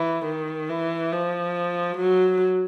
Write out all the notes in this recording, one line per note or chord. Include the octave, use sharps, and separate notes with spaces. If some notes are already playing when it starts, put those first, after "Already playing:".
Already playing: E3
D#3
E3
F3
F#3